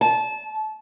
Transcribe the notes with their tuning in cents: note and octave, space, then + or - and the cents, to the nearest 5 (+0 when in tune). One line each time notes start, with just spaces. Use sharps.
A5 -25